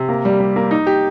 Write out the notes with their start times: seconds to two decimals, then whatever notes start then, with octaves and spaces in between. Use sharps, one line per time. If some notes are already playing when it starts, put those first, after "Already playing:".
Already playing: C3
0.09 A#3
0.25 G3
0.40 G3
0.56 A#3
0.71 D#4
0.87 G4